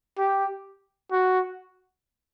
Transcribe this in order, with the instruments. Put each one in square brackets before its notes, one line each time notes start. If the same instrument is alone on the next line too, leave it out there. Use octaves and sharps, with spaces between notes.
[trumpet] G4
F#4